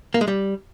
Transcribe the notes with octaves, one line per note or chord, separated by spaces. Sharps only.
A#3
G#3
G3